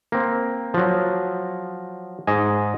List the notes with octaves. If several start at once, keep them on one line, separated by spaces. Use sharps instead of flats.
A#3 C4
F3 F#3
G#2 D#5 G#5